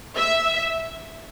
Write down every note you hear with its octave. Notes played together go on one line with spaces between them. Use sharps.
E5